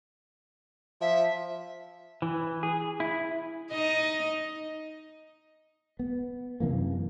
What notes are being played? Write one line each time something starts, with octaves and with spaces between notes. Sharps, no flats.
F3 E5
E3
G#4
E4
D#4 D#5
B3
F#2 C3 E3 A#3